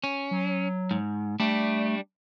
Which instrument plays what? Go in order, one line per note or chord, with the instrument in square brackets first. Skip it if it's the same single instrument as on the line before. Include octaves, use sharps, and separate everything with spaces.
[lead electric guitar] C#4
[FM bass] F#3
[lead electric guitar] G#2
[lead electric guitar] G3 D4 [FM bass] A3